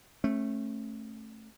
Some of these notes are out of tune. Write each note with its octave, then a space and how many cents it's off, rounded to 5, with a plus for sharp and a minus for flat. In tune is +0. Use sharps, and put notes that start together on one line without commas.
A3 +0 C#4 -35